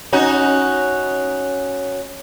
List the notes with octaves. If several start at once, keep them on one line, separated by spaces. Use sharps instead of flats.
C#4 D#4 F#4